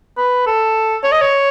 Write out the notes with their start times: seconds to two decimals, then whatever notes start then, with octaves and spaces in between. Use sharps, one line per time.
0.17 B4
0.47 A4
1.04 C#5
1.12 D#5
1.21 C#5